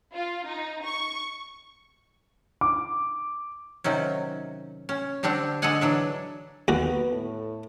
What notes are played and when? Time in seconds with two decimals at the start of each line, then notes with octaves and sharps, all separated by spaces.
0.13 F4
0.45 D#4
0.84 C#6
2.61 D6
3.84 C3 D#3 F#3 C#4
4.89 C#4
5.23 D3 G3 C4 D4 A4
5.62 D3 G#3 G#4 A4 F#5 G#5
5.81 E3 F#3 D4 E5
6.68 D#2 B3 F#4
7.11 A2 A4